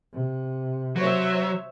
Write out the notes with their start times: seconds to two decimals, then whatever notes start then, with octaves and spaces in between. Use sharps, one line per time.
0.13 C3
0.96 F#3 C5 C#5 E5